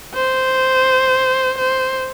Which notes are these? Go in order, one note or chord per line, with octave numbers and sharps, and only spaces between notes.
C5
C5